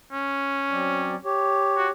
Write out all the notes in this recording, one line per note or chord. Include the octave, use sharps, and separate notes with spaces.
C#4
F#3 C4 D5
G4 C#5
F#4